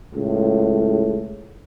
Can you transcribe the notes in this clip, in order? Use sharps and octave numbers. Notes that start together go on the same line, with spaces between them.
C#2 A2